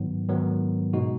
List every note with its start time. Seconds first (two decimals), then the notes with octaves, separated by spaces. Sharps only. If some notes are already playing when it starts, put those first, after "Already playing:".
Already playing: G#2 D#3 F#3 B3
0.29 G#2 D#3 F#3 B3
0.93 B2 G#3 D#4 F#4